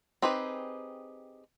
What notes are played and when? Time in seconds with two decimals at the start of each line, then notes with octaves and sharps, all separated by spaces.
0.22 C4 D#4 G4 G#4 B4